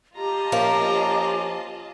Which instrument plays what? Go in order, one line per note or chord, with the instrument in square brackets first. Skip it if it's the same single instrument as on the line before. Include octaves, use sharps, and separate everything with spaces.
[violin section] F4 D#5 A5 [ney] G4 [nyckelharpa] A#5
[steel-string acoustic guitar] F3 A#3 C#4